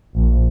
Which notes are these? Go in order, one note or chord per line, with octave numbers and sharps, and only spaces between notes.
A#1